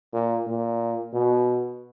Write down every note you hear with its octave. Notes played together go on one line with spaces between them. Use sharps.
A#2
A#2
B2